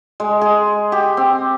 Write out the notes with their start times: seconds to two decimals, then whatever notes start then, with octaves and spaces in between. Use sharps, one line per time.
0.20 G#3
0.41 G#4
0.92 G4
1.17 C4